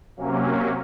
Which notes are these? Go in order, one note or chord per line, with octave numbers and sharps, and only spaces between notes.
C3 F#3 A#3 C#4